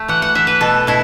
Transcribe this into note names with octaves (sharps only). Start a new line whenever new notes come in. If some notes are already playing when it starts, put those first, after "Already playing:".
Already playing: A3
E3 F#5
F#5
E3 E5
B4
B2 A4
B2 E4